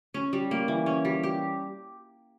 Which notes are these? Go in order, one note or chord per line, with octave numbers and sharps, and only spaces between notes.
C#4
G3
A#3
E3
C#4
G3
G4